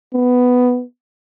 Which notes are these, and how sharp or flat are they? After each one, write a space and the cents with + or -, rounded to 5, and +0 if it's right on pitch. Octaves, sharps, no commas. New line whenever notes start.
B3 +5